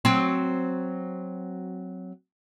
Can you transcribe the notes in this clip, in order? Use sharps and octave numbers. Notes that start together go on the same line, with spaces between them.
F#3 C4